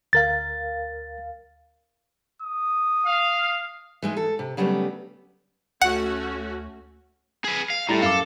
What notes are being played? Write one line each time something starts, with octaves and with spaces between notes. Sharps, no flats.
D2 A#4 F5 A6
D#6
F5
E3 G#3 D#4
A4
C3
C#3 F#3 G3 A3 B3
D2 A3 C#4 F#4 F#5
G#4 B4
F5
A2 G3 E4 A4 A#5 A6
F#2 A4 F5 D6 C7